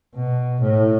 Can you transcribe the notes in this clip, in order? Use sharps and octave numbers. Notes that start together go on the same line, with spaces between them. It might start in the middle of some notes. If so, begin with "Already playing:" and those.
B2
A2